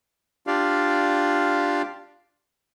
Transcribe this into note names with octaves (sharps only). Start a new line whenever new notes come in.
D4 F4 G4 D5 F5